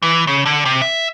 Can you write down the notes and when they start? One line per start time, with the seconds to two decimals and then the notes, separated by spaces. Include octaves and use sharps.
0.02 E3
0.27 C#3
0.46 D3
0.65 C3
0.82 E5